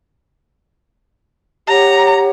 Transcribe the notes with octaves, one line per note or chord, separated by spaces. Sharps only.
G4 C#5 F#5 A#5